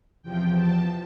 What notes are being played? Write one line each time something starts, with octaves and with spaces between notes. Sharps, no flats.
E2 C3 F3 G5
A5